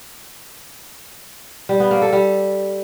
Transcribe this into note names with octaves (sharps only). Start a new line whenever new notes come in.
G3
B3
A#3
A4
G3